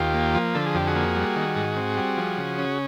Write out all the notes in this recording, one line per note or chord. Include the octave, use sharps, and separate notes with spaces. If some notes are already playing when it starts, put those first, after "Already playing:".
Already playing: D#2 F4 G4
A#3
F3
D3 A4
G#4
F2 G4
F#4 G#4
A#3
G3
D#3
G#2
C4
G3
F3
C#3
C#4